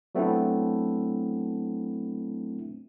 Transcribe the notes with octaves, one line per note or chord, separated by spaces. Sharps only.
F#3 A3 B3 C4 D4 E4